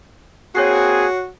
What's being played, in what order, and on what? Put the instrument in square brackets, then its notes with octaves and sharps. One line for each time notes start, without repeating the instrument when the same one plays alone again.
[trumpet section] A#3 C4 G#4 [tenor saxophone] F#4 [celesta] C#5 F#6 C7